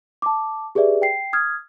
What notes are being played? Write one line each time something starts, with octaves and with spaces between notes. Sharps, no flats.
A5 D6
G4 G#4 B4 D5 E5
G5 C7
D#6 F6 G#6